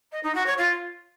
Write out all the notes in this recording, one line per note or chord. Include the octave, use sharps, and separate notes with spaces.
D#5
D#4
F#4
C#5
F4